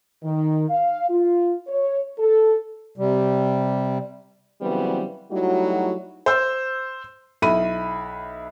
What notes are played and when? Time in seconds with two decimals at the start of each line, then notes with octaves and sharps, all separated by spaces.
0.23 D#3
0.69 F5
1.09 F4
1.68 C#5
2.18 A4
2.98 C3 G3
4.61 C#3 E3 F#3 G3 B3 C4
5.31 F#3 G3 A3 D#4 E4 F#4
6.26 C5 E6
7.42 B1 E4 B5 D#7